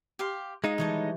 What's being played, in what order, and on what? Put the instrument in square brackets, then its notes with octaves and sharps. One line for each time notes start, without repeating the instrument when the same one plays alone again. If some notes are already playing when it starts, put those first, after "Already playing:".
[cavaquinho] G4 F5 C6
[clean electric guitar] G#3 D#4 [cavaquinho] F4 D#6
[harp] E3 F3 G3 [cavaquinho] A4 C#5 D#5